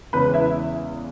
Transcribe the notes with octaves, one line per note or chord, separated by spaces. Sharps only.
E2 C#3 G#3 C#4 B4 B5
E4 E5